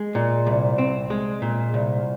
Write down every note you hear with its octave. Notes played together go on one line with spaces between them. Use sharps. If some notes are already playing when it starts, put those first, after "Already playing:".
Already playing: G#3
A#2
C2
C4
G#3
A#2
C2